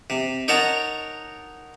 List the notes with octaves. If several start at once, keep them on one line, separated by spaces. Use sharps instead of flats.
C3
D#4 A#4 C#5 F#5 A5 A#5